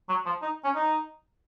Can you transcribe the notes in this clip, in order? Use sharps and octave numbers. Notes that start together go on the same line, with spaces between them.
F#3
F3
D#4
C#4
D#4